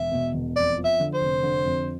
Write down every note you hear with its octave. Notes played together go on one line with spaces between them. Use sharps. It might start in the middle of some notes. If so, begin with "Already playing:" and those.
Already playing: E1 E5
B2
E1
F2 D5
F3
E5
D3
C5
F1
D3
F2